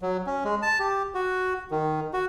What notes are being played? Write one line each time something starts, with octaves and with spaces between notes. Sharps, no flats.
F#3
C#4
G#3
A5
G4
F#4
D#3
F#4